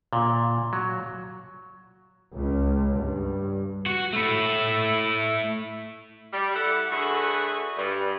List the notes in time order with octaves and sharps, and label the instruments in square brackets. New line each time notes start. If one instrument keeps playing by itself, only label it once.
[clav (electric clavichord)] A#2
F#3
[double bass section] C#2
G2
[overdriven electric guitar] F#4
A3 E4
[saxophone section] G3
E4 G4 A4 F#5
D3 A3 F#4 G#4 B4
G2